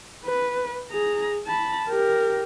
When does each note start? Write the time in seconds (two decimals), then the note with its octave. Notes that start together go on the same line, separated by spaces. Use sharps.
0.25 B4
0.91 G#4 A#5
1.46 A5 B5
1.89 G4 A#4